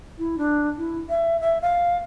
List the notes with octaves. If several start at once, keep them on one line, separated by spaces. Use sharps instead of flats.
E4
D4
E4
E5
E5
F5